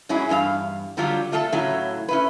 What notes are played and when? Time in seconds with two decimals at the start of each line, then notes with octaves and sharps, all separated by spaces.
0.09 G#2 F#3 C#4 E4 G#4
0.29 E2 G2 D#4 F5
0.97 D3 F#3 G3 D4 F4 G4
1.32 A3 F4 A4 A5
1.52 A2 C#3 F#3 E4
2.08 C#4 E4 B4